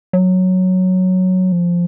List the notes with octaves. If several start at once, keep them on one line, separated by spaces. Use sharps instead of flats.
F#3
F3